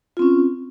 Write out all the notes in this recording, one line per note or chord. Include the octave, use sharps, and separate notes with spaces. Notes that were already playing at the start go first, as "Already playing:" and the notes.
C4 C#4 F4